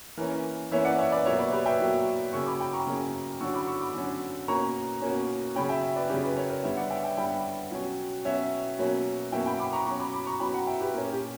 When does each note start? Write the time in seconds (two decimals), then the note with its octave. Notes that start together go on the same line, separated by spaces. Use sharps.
0.17 E3 A#3 C#4 A#4
0.31 A#4
0.71 E3 A#3 C#4 C#5 E5
0.85 D5 F#5
0.98 C#5 E5
1.12 B4 D5
1.25 B2 F#3 A#3 C#5 E5
1.39 B4 D5
1.52 G4 B4
1.66 E5 G5
1.79 B2 F#3 A#3
2.33 C#3 F#3 A#3 C#4 C#6 E6
2.46 B5 D6
2.60 G5 B5
2.73 A#5 C#6
2.87 C#3 F#3 A#3 C#4
3.41 D3 F#3 C#4 C#6 E6
3.54 B5 D6
3.67 C#6 E6
3.81 B5 D6
3.94 D3 F#3 C#4
4.48 B2 A#3 C#4 A#5 C#6
5.02 B2 A#3 C#4
5.56 C#3 F#3 C#4 G5 B5
5.69 E5 G5
5.96 B4 D5
6.09 C#3 F#3 C#4 G4 B4
6.23 B4 D5
6.36 A#4 C#5
6.50 A#4 C#5
6.63 D3 G3 B3 C#5 E5
6.77 D5 F#5
6.90 E5 G5
7.04 E5 G5
7.17 D3 G3 B3 G5 B5
7.71 B2 F#3 C#4
8.25 B2 F#3 C#4 C#5 E5
8.79 B2 F#3 A#3 C#4
9.32 B2 F#3 A#3 C#4 E5 G5
9.46 G5 B5
9.59 B5 D6
9.73 A#5 C#6
9.86 B2 F#3 C#4 A#5 C#6
10.00 B5 D6
10.13 B5 D6
10.27 A#5 C#6
10.40 B2 F#3 C#4 G5 B5
10.54 F#5 A#5
10.67 E5 G5
10.81 G4 B4
10.94 A#2 A#3 C#4 A#4
11.12 G4